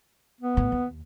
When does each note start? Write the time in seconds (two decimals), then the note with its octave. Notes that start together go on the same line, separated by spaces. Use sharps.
0.41 B3
0.57 D#2 A2
0.72 D#2